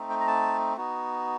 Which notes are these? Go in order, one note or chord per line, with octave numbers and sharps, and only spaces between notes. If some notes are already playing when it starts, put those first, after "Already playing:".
Already playing: A3 C4 D#4
G5
A#5
A5
B3 D#4 F#4